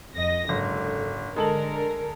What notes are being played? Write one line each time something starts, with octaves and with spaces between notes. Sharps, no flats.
F2 D#5 A#6
F#1 G#2 D3
D3 G#3 A4 A#4 F#7